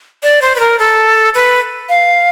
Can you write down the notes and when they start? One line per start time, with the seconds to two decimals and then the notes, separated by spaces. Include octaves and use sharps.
0.23 D5
0.42 C5
0.56 B4
0.60 A#4
0.79 A4
1.35 B4
1.89 F5